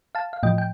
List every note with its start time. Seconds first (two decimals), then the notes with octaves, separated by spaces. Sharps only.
0.15 F5 A5
0.33 F5
0.43 A2 F3 D#5 G5
0.58 G5